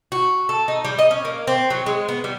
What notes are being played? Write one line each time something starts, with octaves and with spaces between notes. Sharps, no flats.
F#4
A4
D#4
G3
D#5
C#4
A#3
C4
F#3
G#3
B3
G3